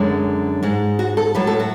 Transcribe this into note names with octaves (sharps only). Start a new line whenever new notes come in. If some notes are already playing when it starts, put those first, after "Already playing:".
Already playing: F#2 D3 G#3
G#2 G#3
F#4
A4
A2 F#3 B4
A4
F#4